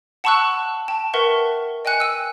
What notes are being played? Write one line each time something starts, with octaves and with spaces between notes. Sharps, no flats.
F#5 A5 B5 C#6 E6 F#6
G5 A5
A#4 B4 E5 F#5 C#6
D#5 G5 G#5 F#6 C#7
E6 D#7